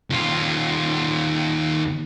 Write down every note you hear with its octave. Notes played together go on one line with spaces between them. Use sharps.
D#2 F4